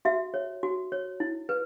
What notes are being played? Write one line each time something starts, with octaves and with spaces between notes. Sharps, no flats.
F#4 E5
C#5
F#4
C#5
E4
B4